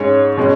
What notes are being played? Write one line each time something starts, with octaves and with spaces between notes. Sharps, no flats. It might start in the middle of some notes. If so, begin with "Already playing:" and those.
Already playing: G#2 G#3 C#4 C#5
B2 G#3 C#4